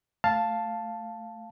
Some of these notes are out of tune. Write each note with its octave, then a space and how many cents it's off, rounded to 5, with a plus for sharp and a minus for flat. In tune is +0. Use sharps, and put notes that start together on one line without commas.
A3 +0 F5 +0 A5 +0